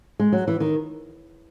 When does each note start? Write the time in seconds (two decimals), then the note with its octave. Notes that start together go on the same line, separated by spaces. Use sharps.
0.20 G#3
0.32 F#3
0.48 E3
0.60 D#3